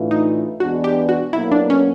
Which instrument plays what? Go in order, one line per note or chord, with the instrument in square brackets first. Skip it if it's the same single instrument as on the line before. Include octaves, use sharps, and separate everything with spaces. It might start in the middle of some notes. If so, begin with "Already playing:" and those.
Already playing: [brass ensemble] A2 E3 A3 D4 F4
[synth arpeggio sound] D#4
[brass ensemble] E2 B2 G#3 B3 D4 [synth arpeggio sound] F#4
[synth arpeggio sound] G4
F#4
[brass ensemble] B1 B2 F#3 A#3 [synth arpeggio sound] E4
[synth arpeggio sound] D4
C#4